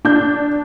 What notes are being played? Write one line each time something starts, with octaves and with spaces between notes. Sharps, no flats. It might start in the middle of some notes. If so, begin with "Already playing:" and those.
D4 G6